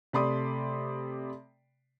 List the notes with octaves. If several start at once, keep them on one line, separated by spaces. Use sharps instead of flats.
C3 A3 D5 B5 C6 D#6